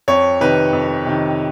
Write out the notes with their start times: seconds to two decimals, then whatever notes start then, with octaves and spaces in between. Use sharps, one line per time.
0.08 F2 C#5
0.41 C3 D#3 B4
0.73 F2
1.05 C3 D#3